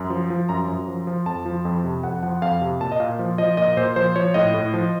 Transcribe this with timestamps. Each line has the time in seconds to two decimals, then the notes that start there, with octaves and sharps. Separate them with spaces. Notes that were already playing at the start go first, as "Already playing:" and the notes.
Already playing: F#2
0.10 F3
0.30 F3
0.49 F#2 A#5
0.68 F#2
0.87 F3
1.07 F3
1.26 F2 A5
1.46 F3
1.65 F2
1.84 C3
2.03 F2 F#5
2.23 F3 F#5
2.42 F2 F5
2.61 C3
2.81 A#2 A5
2.92 D#5
3.00 A#2 F5
3.19 F3
3.38 F3 D#5
3.57 A#2 D#5
3.77 A#2 C5
3.96 F3 C5
4.16 F3 C#5
4.34 A2 D#5
4.54 A2
4.74 F3